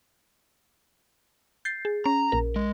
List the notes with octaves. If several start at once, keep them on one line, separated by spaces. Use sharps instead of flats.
G6 A6 C7
G#4
C#4 A#5
A#1 A#4
G#3